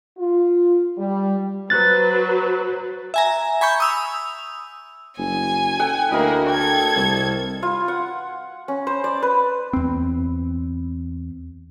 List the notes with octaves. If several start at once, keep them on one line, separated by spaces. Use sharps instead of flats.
F4
G3
F#3 B4 C5 F#6 A6
E5 G#5 A#5
G#5 B5 C#6 G6
D#6 E6 F7
F#1 G#5
A4 F#5 G5
D2 A#3 E4 A#4 D#5
A4 G5 G#6
C2
F4
F#5
C#4
C5
D5
B4
E2 C4